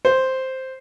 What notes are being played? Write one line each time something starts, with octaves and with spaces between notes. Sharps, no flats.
C5